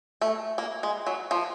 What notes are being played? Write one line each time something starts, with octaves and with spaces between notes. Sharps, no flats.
A3
A#3
G#3
F#3
F3